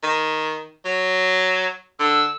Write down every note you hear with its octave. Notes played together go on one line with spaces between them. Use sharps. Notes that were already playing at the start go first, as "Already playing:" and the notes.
D#3
F#3
D3 E6